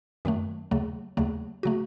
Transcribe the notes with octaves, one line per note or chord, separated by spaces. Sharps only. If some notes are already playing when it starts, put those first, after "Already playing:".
F#2 D#3 F#3 A3
D#2 C#3 F#3 A3
D#2 C#3 F#3 A3
C#3 F#3 A3 F#4